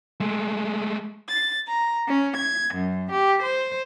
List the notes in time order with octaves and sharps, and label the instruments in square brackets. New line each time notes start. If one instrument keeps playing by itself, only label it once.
[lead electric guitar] G#3 A3
[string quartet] A6
A#5
C#4
G#6
F#2
G4
C5